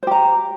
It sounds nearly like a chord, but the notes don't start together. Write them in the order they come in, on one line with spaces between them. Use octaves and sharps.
C5 G4 A#5